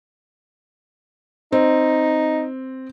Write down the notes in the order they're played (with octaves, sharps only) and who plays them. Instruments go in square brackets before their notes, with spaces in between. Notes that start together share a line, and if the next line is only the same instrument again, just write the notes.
[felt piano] C4 [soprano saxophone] D#4